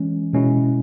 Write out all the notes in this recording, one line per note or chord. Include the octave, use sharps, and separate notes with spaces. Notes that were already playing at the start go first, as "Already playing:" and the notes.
Already playing: E3 G#3 C#4
B2 G#3 C#4 E4